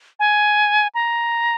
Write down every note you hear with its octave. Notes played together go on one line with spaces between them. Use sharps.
G#5
A#5